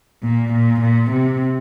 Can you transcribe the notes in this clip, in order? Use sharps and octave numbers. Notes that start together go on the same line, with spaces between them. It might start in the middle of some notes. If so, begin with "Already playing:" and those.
A#2
A#2
A#2
C3